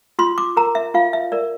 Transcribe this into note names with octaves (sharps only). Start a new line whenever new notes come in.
F4 C6
D6
A#4 A#5
E5
F4 F5
E5
A#4 D5